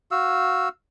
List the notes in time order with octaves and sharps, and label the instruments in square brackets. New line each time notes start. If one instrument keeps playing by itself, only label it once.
[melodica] F#4 F5 E6